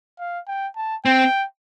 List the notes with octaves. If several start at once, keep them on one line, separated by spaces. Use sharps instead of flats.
F5
G5
A5
C4 G5